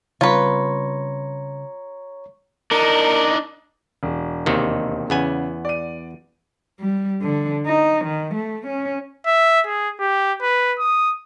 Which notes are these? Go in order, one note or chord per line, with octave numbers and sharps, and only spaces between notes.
C#3 G3 C4 F4 B4 C#5 A#5 C#6
D4 D#4 A#4
E1
D#2 C3 D#3
E2 C#3 B3 G#5
D5 D#7
G3
D3
D#4
D#3
A3
C#4
E5
G#4
G4
B4
D#6